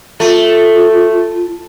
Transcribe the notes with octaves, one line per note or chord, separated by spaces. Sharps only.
A3 F4